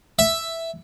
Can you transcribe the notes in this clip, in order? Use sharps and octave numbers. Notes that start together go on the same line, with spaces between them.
E5